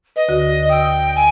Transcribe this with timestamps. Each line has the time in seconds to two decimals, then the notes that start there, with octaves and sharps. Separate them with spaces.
0.16 B4 D#5
0.29 D2 D3 F#4
0.69 G5 D#6 E6
1.16 G#5